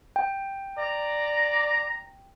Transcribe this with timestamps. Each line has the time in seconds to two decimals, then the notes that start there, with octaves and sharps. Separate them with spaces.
0.16 G5
0.78 D5 A#5